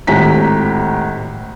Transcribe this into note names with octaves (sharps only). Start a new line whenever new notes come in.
G#1 A2 G4 A#5 B6